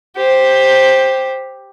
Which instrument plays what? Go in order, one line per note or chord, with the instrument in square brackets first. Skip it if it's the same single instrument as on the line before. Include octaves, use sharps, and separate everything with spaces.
[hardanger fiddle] G4 C5